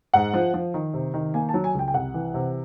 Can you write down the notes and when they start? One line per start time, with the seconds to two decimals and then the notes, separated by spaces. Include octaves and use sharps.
0.14 G#2 F#5
0.34 F3
0.54 F3
0.74 D#3
0.94 C3
1.14 D#3
1.34 A#3 G#5
1.49 A5
1.54 F#3
1.64 G#5
1.75 C#2 G5
1.88 G5
1.94 C2 F#5
2.14 E3
2.34 C3